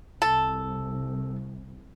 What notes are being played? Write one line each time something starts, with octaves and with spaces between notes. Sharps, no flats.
C2 A4